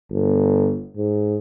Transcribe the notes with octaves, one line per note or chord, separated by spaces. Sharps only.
G1
G#2